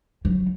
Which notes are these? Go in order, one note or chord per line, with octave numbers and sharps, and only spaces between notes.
F#3